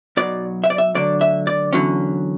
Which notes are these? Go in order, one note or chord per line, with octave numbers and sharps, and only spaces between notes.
B1 B2 F#3 D5
E5
D5
E5
D2 D3 F#3 D4 D5
E5
D5
E2 D3 F#3 C#4